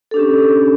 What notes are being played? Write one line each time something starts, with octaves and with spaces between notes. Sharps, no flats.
C#4 D4 G4 A4